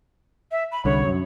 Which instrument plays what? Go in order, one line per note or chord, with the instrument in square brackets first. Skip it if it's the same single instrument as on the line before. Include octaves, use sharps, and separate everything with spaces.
[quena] E5
B5
[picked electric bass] C2 D3 [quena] C#5
[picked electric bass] F#2